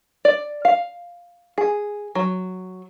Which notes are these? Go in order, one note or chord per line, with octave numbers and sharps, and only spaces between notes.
D5
F5
G#4
F#3